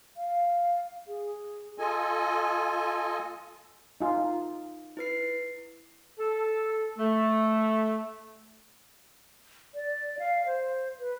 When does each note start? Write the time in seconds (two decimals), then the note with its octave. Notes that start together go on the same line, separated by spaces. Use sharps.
0.16 F5
1.07 G#4
1.78 F4 A4 D#5 G#5
4.01 D#4 F4
4.97 E4 B4 C7
6.19 A4
6.98 A3
9.75 D5
10.19 F5
10.46 C5
11.00 B4